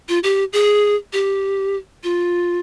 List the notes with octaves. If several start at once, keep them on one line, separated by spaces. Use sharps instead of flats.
F4
G4
G#4
G4
F4